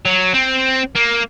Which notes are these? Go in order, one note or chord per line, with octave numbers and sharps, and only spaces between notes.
F#3
C4
A#3